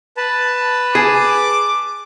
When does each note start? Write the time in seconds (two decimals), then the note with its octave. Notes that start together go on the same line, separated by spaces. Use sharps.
0.17 B4 A5
0.95 G#4 D6